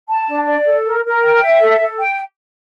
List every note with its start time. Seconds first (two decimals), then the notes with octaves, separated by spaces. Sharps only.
0.08 A5
0.28 D4
0.47 D5
0.66 A4
0.85 A#4
1.04 A#4
1.23 G5
1.42 E5
1.61 A4
1.80 A4
1.99 G5